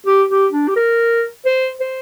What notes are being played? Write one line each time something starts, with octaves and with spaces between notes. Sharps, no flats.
G4
G4
D4
G4
A#4
C5
C5